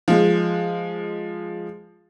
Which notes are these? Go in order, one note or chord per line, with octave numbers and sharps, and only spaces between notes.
F3 G#3